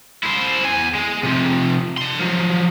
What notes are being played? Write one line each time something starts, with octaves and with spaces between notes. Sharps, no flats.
E4 C5
E2 G#5
G#3
C3 F3
D4 C6
F3 F#3